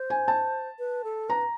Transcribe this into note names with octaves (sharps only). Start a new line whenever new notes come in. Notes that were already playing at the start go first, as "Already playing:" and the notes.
Already playing: C5
G#5
A5
B4
A4
B4 A#5